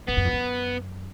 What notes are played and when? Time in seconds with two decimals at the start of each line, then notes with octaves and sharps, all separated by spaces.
0.08 G#2 B3
0.17 F#2
0.25 F2
0.33 F#2